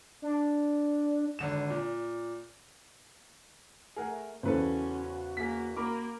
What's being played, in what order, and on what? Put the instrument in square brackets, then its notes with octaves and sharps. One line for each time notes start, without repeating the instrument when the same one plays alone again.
[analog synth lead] D4
[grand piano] G#1 D3 E7
A#2
[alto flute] A3 [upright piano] G#4 A#4 F#5
[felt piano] E2 C#3 [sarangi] C#4 [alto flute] F#4 [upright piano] A4 B4 C5
[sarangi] A#3 [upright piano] G#4 B6
[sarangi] A#3 [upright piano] A#4 B5 D6